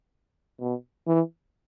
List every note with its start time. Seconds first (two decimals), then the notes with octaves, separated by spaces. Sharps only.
0.60 B2
1.07 E3